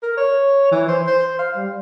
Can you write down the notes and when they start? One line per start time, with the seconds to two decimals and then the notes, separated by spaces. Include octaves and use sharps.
0.03 A#4
0.18 C#5
0.72 E3
0.88 C5
1.07 C5
1.39 F5
1.56 G3